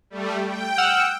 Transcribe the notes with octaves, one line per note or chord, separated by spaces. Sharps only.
G3 A3
G5
F#5 E6 F6